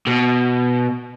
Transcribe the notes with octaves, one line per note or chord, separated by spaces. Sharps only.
B2